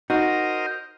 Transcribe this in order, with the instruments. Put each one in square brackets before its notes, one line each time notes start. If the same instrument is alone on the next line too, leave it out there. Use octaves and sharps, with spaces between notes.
[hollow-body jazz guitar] D#4 F#4 [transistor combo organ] A#4 C5 D#5